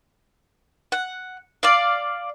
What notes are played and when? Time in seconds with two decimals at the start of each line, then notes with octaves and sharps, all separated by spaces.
0.92 F#5
1.63 D5 F5